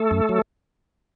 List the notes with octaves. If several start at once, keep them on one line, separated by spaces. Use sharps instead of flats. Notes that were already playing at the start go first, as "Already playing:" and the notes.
Already playing: A3 A4
F#2
F#3